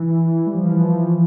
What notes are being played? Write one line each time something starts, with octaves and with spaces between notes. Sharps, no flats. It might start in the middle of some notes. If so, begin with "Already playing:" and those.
Already playing: E3
G3
F3
E3
F3